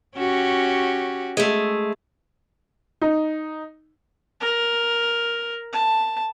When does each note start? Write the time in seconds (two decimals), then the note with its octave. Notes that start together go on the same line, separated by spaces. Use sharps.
0.16 C#4 F#4 G4
1.37 G#3 A3
3.01 D#4
4.40 A#4
5.73 A5